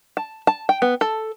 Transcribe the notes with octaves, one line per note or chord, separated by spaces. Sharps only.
A5
A5
G5
B3
A4